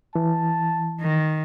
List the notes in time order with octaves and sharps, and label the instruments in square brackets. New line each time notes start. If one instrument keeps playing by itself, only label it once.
[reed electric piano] E3 [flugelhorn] A5
[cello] D#3